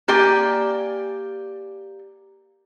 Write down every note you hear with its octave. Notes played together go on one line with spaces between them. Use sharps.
A#3 G4 D5 G#5